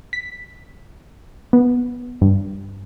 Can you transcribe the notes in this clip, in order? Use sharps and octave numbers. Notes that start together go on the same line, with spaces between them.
B6
B3
G2